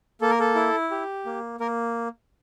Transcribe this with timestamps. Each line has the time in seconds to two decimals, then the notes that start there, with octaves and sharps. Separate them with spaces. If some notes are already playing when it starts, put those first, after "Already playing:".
0.21 A#3 A4
0.30 A#4
0.40 A4
0.55 E4
0.91 G4
1.26 A#3
1.60 A#3 A#4